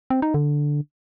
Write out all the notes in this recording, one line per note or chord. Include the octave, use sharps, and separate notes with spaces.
C4
D#4
D3